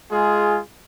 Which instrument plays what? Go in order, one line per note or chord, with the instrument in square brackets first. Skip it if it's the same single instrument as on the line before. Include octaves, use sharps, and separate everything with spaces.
[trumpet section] G#3 F4 G#4